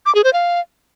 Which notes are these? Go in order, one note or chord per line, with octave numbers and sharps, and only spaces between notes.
D6
G#4
C5
F5